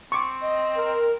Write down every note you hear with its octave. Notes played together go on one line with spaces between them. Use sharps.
C4 C#6 D6
D#5
A#4